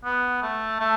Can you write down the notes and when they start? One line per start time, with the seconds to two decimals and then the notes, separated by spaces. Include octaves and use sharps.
0.04 B3
0.42 A3
0.79 A3